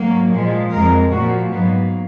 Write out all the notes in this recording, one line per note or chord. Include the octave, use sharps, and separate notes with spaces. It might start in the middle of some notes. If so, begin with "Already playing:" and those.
Already playing: G#2 F#3 A#3
A#2 F3 G#3
F2 F3 G#3 A#4
A#2 F3 A#3 F#4
G#2 F#3 A#3 B3